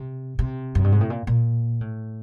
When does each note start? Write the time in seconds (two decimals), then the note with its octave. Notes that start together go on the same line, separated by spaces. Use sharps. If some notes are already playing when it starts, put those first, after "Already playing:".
Already playing: C3
0.39 C3
0.75 F#2
0.84 G2
0.92 G#2
1.01 A2
1.10 A#2
1.27 A#2
1.81 A2